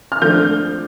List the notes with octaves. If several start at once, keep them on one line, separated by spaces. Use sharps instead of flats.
F6
F3 A3 D4 G6